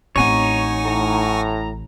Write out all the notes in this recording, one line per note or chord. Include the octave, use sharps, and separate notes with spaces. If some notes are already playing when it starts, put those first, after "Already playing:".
A1 C4 D#4 C#5 F#5 G#5 C#6
A2 A#5